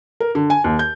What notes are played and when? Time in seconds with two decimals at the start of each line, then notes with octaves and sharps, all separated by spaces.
0.20 A#4
0.35 D3
0.50 G#5
0.64 D#2
0.79 G6